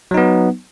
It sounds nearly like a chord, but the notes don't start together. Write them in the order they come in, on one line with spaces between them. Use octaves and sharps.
F#3 D#4 B3